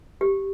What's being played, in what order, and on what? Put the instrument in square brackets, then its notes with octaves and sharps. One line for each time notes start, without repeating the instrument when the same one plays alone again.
[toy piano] G4